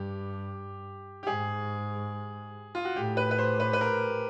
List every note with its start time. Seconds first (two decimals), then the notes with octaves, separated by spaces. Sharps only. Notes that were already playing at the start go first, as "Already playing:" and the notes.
Already playing: G2 G4
1.23 G4
1.27 G#2 G#4
2.75 F4
2.85 F#4
2.96 A2 G4
3.17 B4
3.31 B4
3.38 C5
3.60 B4
3.73 B4
3.81 A#4